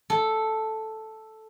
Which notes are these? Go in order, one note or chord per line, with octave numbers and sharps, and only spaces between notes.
A4